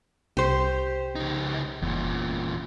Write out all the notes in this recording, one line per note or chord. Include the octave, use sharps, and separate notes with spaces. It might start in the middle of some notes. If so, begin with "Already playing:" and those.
C2 G4 C5
C#2 D#4
F#1 E2 A#2